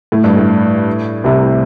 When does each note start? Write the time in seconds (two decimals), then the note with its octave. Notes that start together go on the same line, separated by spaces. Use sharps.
0.12 A2
0.24 G2
0.37 A2
1.24 C2 C3